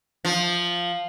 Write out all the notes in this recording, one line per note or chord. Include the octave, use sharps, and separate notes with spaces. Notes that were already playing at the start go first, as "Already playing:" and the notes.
F3